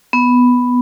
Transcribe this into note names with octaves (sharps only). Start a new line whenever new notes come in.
B3